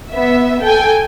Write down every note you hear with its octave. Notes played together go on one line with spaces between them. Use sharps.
B3 E5
A4 G5 G#5